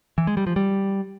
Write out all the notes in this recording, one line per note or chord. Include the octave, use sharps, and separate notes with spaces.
E3
G#3
G3
F3
G3